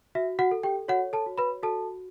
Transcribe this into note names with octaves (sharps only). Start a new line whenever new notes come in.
F#4 E5
F#4 F#5
A4
G4 G5
F#4 C#5 F#5
A4 A5
F#4
B4 B5
F#4 A4 A5